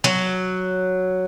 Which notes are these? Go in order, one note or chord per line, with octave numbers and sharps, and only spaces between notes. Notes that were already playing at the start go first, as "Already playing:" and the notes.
F#3